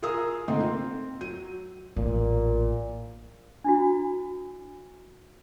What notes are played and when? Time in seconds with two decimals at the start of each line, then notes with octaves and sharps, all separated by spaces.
0.02 F4 G#4 A#4 F5 D#6 E6
0.48 D3 A3 A#3 C4 D#4 F4
0.63 C4
1.21 F#3 D#7
1.97 A1 A#2
3.64 D4 E4 F#4